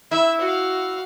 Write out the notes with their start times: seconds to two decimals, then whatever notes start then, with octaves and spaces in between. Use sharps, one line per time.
0.11 E4 E5
0.40 F#4 F5